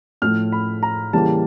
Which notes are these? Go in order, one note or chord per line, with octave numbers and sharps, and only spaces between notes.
A2 F3 A3 F6
B5
A#5
C#3 E3 G3 A#3 A5